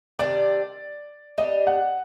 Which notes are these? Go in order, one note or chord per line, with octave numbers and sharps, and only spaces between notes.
C3 D#3 G3 D4 D5
G3 D4 G4 D#5
F#5